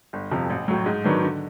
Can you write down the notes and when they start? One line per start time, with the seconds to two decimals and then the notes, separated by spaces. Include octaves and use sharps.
0.13 G1
0.31 F2 C3 F3
0.50 A1
0.68 A2 F#3
0.86 G#2
1.04 D#3 F#3 B3 D4
1.22 D3